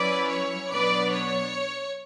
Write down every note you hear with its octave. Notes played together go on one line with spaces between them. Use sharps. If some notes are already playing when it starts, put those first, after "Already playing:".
Already playing: F#3 C#4 E4 B4 D5
C#5
B2 F#3 B3 D4 B4 D5
C#5